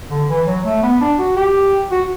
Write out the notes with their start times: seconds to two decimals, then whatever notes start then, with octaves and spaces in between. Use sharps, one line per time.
0.11 D3
0.29 E3
0.47 F#3
0.65 A3
0.83 B3
1.01 D4
1.19 F#4
1.37 G4
1.92 F#4